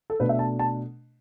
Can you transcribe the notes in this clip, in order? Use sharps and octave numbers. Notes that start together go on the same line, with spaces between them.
A4
B2 A3 D4 B4
E5
A5
A5